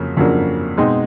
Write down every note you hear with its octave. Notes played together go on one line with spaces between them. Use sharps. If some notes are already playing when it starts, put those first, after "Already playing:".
Already playing: F2 C#3 F#3 A#3
F2 C#3 F#3 A#3 D4
B2 G#3 C4 D#4